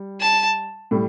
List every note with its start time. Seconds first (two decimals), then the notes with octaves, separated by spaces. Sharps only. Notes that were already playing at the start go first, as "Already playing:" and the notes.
Already playing: G3
0.21 A5
0.91 A2 G3